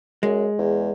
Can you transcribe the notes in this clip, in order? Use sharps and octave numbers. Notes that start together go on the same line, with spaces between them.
F#2 G#3
E2